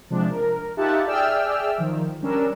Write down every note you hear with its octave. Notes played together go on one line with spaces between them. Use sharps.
C3 F3 G#3 D4
A#4
D#4 F4 G4 E5 F#5 A5
G#4 D5 E5 G5 E6 F6
D#3 F3
G3 C#4 D4 A#4 E6